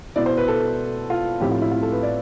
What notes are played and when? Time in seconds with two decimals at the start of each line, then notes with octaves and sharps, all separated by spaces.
0.16 B2 B3 E4 D5
0.26 C5
0.37 B4
0.48 A4
1.10 F4
1.40 A2 F3 C4 E4 G4
1.51 F4
1.61 E4
1.72 F4
1.82 A4
1.92 B4
2.03 D5